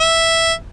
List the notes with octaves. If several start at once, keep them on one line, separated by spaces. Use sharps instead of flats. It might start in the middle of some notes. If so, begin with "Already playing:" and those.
E5